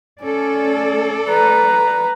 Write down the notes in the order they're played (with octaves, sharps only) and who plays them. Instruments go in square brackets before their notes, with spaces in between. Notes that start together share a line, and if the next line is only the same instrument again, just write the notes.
[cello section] A3 A4 D5 [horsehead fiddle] C#4
[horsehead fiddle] B4 A#5